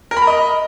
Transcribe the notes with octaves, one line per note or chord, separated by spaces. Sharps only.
A#4
B5
A#5
D#5